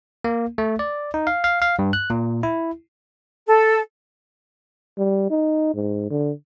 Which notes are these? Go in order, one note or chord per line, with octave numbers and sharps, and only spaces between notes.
A#3
A3
D5
D#4
F5
F5
F5
G2
F#6
A#2
E4
A4
G3
D#4
G#2
D3